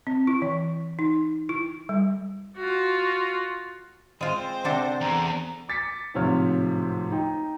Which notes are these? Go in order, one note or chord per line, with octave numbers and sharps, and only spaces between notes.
C4
E4
E3
D#4
E4
G3
F4 F#4
G#3 C4 F4 C5
C3 D4 A4 F#5
E2 A#5
D6 A6 B6 C#7
D1 G#2 C3 F3 C#5 F6
D#4 G5